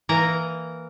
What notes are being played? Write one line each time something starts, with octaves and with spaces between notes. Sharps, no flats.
E3 A#3 A#5